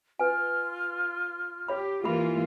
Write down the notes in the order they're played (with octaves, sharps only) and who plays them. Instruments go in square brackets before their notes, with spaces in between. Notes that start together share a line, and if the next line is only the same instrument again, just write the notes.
[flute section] F4 F6 [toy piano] B4 G#5
[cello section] G4 [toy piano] C#5 B5
[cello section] E3 A#3 F4 [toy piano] G4 B5